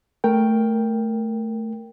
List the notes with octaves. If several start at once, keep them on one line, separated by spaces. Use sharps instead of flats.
A3 A#4 G5